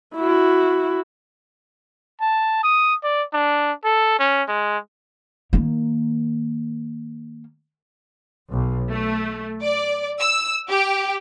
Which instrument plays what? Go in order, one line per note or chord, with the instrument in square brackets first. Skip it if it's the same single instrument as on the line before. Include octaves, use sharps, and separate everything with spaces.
[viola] E4 F#4
[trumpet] A5
D#6
D5
D4
A4
C#4
G#3
[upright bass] D#3 A#3
[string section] B1
A3
D5
E6
G4